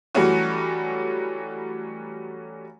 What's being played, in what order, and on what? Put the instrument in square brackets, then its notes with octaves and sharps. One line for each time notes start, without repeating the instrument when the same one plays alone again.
[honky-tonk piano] E3 F#3 G3 A3 C#4 F#4